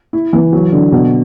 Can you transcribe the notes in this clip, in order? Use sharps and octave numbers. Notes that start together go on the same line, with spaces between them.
E4
E3
F#3
D3
B2